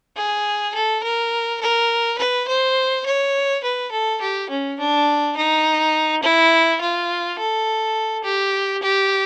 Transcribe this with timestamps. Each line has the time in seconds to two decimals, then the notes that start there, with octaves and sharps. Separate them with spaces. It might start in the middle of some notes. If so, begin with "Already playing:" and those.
0.17 G#4
0.75 A4
1.03 A#4
1.61 A#4
2.19 B4
2.48 C5
3.06 C#5
3.64 B4
3.92 A4
4.22 G4
4.50 C#4
4.80 D4
5.37 D#4
6.23 E4
6.81 F4
7.39 A4
8.24 G4
8.83 G4